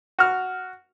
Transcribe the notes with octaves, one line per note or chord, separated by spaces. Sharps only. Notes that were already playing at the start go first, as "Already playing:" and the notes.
F#4 F6